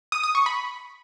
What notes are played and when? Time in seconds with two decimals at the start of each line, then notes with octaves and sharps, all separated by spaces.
0.12 D#6
0.23 D#6
0.35 C#6
0.46 B5